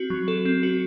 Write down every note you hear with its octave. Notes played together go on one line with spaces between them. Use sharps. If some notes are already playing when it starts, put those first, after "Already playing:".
Already playing: C4 F#4
F#3
A4
C4
F#4